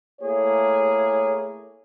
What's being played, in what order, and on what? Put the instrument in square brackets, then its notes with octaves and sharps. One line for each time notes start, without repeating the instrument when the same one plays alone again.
[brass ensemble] A3 A#3 E4 G#4 C#5